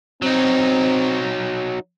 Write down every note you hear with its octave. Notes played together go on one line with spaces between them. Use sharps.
F#3 C4 D#4